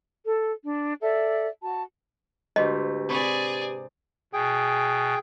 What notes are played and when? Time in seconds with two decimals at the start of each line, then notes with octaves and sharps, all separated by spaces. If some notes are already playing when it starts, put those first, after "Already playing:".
0.24 A4
0.64 D4
1.01 A4 D5 E5
1.61 F#4 A5
2.56 D2 G#2 G4 B4 D#5
3.09 C3 G#4 D5 B5 C#6
4.33 B2 G#4 G5